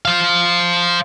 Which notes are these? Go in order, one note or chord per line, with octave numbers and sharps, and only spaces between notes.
C5 F5